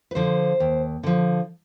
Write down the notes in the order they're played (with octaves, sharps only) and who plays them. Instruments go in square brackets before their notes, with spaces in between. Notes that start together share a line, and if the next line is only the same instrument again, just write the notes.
[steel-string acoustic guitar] B4
D3 F3 C5
D#2
D3 F3